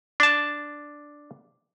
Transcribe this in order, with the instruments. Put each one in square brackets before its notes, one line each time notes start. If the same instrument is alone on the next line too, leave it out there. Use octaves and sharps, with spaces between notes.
[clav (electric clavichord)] D4 A5